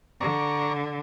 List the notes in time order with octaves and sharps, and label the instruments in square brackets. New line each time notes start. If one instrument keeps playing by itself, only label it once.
[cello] D3 [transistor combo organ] D5 A#5 C#6